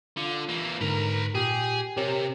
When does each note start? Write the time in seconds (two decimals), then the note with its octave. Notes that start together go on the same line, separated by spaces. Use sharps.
0.17 D3 F4
0.49 E3 A#3
0.81 G#2 D3 A#4 B4 A#5
1.35 A#2 G4 G#4
1.97 C3 G4 A#4 C#5